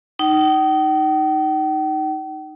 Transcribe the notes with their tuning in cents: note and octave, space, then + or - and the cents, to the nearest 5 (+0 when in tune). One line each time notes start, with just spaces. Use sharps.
D#4 +0 G5 -45